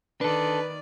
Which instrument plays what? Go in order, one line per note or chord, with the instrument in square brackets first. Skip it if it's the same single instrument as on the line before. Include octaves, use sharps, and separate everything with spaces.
[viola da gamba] D#3 D5 [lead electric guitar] D4 A4 [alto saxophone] B4